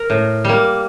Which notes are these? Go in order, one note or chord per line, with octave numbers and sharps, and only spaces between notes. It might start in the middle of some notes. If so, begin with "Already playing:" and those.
Already playing: A#4
A2
G3 A#3